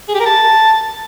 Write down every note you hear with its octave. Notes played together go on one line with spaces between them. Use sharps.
G#4
G4
A#4
A5